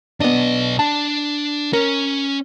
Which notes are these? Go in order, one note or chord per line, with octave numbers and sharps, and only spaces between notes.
B1 B3 D4 D#5
D4 A5
C#4 A#4